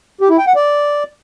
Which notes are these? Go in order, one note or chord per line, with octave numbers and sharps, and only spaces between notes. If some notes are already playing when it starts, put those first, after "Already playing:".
G4
E4
G5
F#5
D5